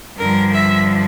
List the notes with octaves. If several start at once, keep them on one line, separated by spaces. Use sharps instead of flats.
G2 D3 F3 A#4
E5